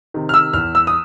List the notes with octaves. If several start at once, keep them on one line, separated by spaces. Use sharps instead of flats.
C3 D#3
F6
E6
E2 F6
E6
D#6